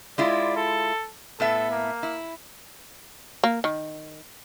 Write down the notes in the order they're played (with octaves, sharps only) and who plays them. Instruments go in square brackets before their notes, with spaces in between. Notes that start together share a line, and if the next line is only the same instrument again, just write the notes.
[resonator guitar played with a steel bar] G#3 E4 F4 [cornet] D5
[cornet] A4
[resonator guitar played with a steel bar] A2 B3 E5 [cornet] A4
[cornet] A#3
[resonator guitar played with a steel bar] E4
[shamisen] A#3
D#3